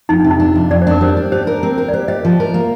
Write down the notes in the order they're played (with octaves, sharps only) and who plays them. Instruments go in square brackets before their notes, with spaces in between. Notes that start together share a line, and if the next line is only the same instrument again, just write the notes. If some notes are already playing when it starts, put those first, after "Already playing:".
[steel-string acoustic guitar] F2 [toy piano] D#4
[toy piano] D4
[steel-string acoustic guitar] C3
[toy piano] D#4
[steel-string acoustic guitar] D4
F2
[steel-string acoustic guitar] F2 [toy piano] D5
[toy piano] C5
[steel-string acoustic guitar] D4 [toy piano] A#4
[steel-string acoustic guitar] G3 [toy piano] C5
[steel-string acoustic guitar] D4
[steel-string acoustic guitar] G4 [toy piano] C5
[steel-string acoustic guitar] A#4
C4
A#4
[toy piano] D5
[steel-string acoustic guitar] G4 [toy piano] C5
[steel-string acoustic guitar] G4 [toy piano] C5 D#5
[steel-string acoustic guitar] F3
A#4
A#3